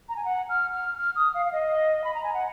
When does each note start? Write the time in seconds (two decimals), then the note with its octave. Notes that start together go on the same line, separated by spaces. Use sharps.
0.09 A#5
0.16 G#5
0.25 F#5
0.49 F6
0.73 F6
0.97 F6
1.16 D#6
1.34 F5
1.46 F5
1.52 D#5
2.04 B5
2.15 A#5
2.24 G#5
2.34 F#5